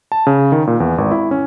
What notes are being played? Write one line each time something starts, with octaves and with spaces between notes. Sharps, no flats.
A5
C#3
D#3
A#2
E2
G#1
E4
C#4